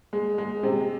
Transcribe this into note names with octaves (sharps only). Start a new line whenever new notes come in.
G#3
G#3
C3